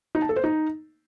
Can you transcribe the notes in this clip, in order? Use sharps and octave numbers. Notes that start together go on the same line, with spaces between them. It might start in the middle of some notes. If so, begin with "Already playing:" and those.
D#4
A5
A4
C5
D#4